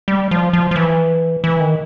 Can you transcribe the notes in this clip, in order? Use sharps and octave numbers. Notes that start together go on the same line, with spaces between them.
G3
F3
F3
F3
E3
E3
D#3